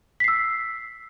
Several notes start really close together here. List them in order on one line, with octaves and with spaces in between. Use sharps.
B6 C7 E6